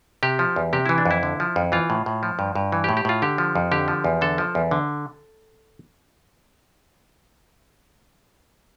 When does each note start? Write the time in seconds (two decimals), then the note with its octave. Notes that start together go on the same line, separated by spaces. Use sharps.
0.23 C3 G4
0.39 F3
0.56 E2
0.73 C3 G4
0.86 E3 E4
0.98 D4
1.06 F2
1.11 E4
1.23 D3
1.40 F3
1.56 F2
1.72 E3 F4
1.90 A2
2.06 A2
2.23 F3
2.39 G2
2.55 G2
2.72 E3
2.84 G4
2.89 A2
2.97 G4
3.05 A2 F4
3.22 D3 G4
3.38 F3
3.56 F2
3.71 D3 G4
3.88 F3
4.04 E2
4.21 D3 A4
4.38 F3
4.55 E2
4.71 D3